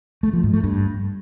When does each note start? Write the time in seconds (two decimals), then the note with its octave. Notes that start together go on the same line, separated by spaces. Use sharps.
0.23 A3
0.33 F3
0.43 G#2
0.53 A3
0.64 G2